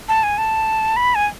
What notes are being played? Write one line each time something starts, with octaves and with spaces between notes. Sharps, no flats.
A5
G#5
A5
B5
G#5